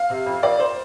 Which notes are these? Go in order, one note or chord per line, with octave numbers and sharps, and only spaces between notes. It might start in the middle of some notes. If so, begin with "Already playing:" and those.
Already playing: F5
C3
F2
F2 D5
C5